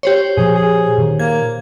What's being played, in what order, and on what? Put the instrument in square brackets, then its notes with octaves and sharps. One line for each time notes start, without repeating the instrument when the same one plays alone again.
[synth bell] G4 C5 C#5
[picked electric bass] A#2 F3 [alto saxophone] G#4
[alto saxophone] G#4
[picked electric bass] A#2 D#3
[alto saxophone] A#3 [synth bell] G#6